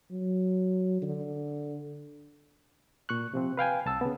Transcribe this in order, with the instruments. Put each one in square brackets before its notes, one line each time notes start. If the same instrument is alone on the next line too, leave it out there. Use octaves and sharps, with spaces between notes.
[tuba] F#3
D3
[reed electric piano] A#2 C#6 F#6
C3 F3 C4
B4 F5 G5 G#5
C2 A5 E6
C#3 B3